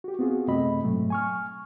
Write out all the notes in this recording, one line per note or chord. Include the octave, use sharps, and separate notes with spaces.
F#4 G4
B3 C4 F4 F#4 G#4
F#2 C3 A3 C4 D#5 B5
G#2 B2 F#3 A3
G#5 C#6 F6